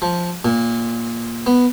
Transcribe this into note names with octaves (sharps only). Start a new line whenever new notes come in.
F3
A#2
B3